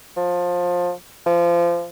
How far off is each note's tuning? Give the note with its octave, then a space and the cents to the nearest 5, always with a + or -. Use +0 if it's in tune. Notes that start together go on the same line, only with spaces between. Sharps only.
F3 +20
F3 -25